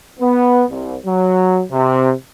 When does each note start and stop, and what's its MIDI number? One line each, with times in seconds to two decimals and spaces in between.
0.20 0.65 59
0.69 0.96 36
1.05 1.63 54
1.72 2.13 48